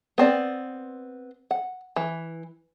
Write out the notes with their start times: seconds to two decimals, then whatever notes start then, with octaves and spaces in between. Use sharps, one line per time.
0.18 B3 C4 D5
1.51 F#5
1.96 E3